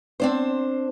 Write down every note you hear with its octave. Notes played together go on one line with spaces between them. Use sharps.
C4 D4 C5